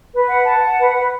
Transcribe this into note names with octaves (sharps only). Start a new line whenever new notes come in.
B4
F#5
A5
F#5
B4
B4